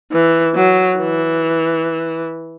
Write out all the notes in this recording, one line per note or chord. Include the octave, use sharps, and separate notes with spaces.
E3
F#3
E3